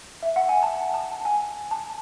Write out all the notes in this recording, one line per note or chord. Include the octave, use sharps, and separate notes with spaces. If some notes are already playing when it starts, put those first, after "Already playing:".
E5
F#5
G#5
A5
A5
G#5
A5